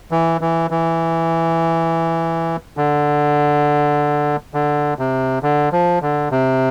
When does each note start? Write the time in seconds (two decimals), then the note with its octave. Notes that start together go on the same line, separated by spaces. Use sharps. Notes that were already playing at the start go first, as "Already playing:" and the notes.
0.11 E3
0.41 E3
0.71 E3
2.77 D3
4.54 D3
4.99 C3
5.43 D3
5.72 F3
6.02 D3
6.31 C3